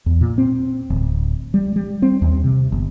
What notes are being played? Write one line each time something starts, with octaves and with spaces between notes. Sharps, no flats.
E2
A#2
C4
D1
G3
G3
C4
D#2
C3
G1